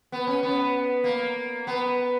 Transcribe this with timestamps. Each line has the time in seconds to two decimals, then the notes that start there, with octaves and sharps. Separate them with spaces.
0.12 B3
0.27 C#4
0.43 B3
1.04 A#3
1.67 B3